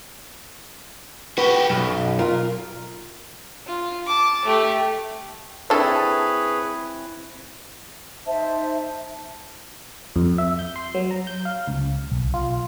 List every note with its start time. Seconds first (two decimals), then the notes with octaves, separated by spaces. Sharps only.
1.38 F#4 G4 B4
1.70 B1 F#2
2.19 F4 A#4
3.66 F4
4.06 A5 D6
4.45 A3 G4
5.70 C4 D4 E4 G#4 A4 B4 C#5
8.26 D#4 C5 E5 A5
10.16 F2
10.38 E5
10.59 G6
10.76 C6
10.95 F#3
11.11 A#5
11.27 G6
11.45 F5
11.68 C#2
12.12 B1
12.34 F4